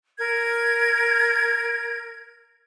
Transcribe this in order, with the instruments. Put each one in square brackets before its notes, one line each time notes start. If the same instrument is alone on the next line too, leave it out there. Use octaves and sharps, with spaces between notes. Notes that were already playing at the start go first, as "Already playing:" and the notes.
[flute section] A#4 G#6